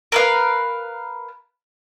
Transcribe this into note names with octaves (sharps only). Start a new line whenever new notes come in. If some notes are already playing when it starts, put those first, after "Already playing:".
A#4 B4 F5